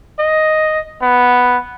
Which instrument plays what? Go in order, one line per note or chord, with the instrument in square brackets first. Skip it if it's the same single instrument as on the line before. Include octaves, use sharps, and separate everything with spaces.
[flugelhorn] D#5
B3